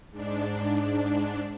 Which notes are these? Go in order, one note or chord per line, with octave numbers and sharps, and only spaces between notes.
G#2 D4